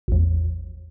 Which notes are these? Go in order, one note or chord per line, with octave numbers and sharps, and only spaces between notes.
A1 E2